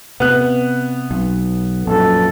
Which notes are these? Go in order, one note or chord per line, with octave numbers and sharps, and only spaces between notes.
C3 B3 F#6
B1
A#1 F#2 A4